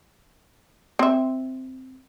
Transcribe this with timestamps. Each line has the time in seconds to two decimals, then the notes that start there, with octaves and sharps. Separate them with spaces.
0.99 C4 E5